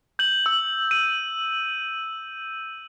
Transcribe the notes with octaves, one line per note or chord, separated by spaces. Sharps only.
G6 F#7
E6
D#7